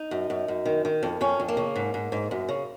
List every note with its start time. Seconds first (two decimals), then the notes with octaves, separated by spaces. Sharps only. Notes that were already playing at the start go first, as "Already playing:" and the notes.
Already playing: D#4
0.11 F#2
0.30 F#2
0.48 F#2
0.66 D#3
0.85 D#3
1.03 F2
1.21 F2 C#4
1.40 F2
1.48 A#3
1.57 C#3
1.76 G#2
1.94 G#2
2.12 G#2
2.31 F#2
2.49 C#3